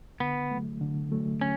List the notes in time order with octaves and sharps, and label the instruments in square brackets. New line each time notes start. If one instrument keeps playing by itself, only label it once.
[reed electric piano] D3 [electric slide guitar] B3
[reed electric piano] F#3 A3
D3
F#3 A3
[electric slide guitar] C#4